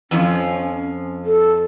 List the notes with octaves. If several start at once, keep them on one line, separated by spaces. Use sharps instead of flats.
F2 F3 C#4
A4